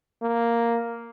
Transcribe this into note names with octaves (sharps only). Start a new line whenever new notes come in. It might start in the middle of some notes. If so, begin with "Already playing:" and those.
A#3